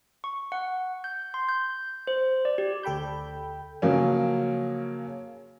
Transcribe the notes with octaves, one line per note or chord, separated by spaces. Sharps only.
C#6
F#5
G6
C6
G6
C5
D5
G4
D2 A4 G5 B5 G6
C#3 F3 F#3 A#3 C#4